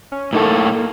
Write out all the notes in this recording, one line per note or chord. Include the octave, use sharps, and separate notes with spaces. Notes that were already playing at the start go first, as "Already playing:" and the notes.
C#4
A2 A#3 D#4 A4